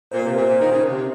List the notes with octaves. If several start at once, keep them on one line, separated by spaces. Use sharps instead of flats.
A#2 C5
A#4
C3 C5
A#2
A#2
D#3
C#3
C3
C3